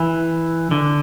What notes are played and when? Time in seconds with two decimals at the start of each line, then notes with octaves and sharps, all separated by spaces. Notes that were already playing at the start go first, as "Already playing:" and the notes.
Already playing: E3
0.71 D3